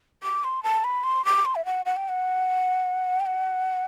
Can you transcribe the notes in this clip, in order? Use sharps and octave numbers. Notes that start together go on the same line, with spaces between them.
D6
C6
A5
B5
C6
D6
C6
E5
F#5
F#5
G5
F#5
G5
F#5